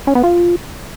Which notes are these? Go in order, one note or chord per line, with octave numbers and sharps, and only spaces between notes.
C#4
B3
F4